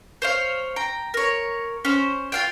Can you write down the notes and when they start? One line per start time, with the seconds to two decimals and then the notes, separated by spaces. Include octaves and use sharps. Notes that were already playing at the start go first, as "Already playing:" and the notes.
0.22 C5 C#5 F5
0.76 G5 A#5
1.14 A#4 C#5
1.85 C#4 C5
2.32 F4 F5 G5